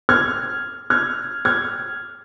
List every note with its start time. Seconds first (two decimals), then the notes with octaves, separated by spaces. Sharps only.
0.09 F6 G#6
0.90 F6 G#6
1.45 F6 G#6